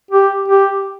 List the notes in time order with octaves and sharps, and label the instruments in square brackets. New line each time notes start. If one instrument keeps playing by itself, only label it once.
[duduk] G4
G4